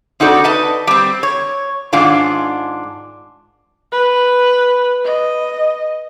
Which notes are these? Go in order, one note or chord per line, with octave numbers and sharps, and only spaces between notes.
C4 D#4 F#4 A4 D5
B4 D#5 A5
G3 C4
C#5
G#2 D#3 C#4 D4 F4
B4
D#5